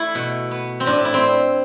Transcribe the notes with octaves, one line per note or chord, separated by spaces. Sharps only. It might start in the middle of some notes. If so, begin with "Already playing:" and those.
Already playing: A3 E4
B2
B3
C4
A2 D4
E4
C4